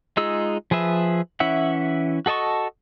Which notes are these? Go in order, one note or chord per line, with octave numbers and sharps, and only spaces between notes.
G#3 D#4 F4 G#4 E6
F3 G#4 B4 E5
E3 C#4 E4 E5 F#5
F#4 A4 D#5 A5 C#6